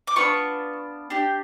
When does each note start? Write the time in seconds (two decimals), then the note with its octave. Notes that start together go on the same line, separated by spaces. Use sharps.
0.07 D6
0.16 B3 D4 F4 C#6
1.10 D4 G4